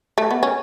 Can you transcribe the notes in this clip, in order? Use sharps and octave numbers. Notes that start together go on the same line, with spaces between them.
A3
B3
C#4